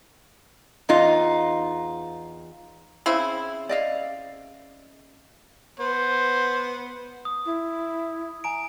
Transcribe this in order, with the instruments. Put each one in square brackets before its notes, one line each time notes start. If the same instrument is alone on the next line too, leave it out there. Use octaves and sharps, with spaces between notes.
[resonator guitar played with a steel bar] E2 D#4 F4
[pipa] C#3 C4 E4
[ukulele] D5 D#5 F5
[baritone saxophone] B3 [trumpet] C5
[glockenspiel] D#6
[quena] E4
[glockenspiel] G#5 A#5 D7